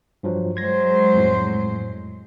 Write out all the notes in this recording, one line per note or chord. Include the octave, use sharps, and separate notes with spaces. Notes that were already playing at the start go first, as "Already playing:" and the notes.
G2 F3 F#3
F#3 G#3 C5 G#6 A#6
F2 A2